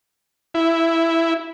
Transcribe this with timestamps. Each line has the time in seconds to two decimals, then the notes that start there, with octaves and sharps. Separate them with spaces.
0.54 E4